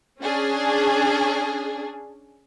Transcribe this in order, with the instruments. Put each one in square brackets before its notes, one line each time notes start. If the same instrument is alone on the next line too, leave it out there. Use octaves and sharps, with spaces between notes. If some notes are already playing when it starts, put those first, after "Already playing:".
[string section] C#4 D4 G#4